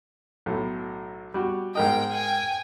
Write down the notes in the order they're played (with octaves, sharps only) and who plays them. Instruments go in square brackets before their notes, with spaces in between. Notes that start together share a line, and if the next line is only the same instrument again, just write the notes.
[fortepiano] B1 A2
G3 F#4
[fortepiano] G#2 A#4 D#5 [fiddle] G5
[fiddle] G5 G#5